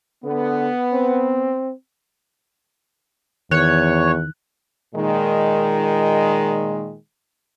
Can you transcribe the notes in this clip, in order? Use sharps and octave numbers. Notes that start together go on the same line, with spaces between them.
D3 B3
C4
E2 D#3 C#5 F#6
A#2 D#3 G#3